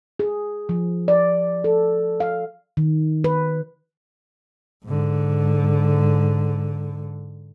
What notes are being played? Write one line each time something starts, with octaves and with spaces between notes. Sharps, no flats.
G#4
F3
D5
A4
F5
D#3
B4
G#2 D3